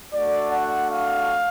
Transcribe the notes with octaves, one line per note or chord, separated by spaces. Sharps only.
A3 D4 F#4 D5
F#5
F5